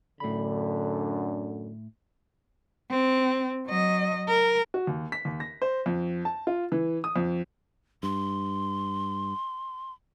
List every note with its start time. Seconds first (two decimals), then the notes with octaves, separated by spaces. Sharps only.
0.20 F#2 A2 D3 B5
2.90 C4
3.66 F#3 D#5
4.28 A#4
4.74 F#4
4.87 D#2
5.12 B6
5.25 D#2
5.40 A#6
5.62 C5
5.86 F2
6.25 A5
6.47 F4
6.72 E3
7.04 D#6
7.16 F2
8.03 G2 C6